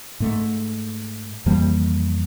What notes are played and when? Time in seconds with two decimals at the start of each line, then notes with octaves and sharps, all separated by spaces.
0.20 G#2 A3
1.46 F2 E3 G3 A#3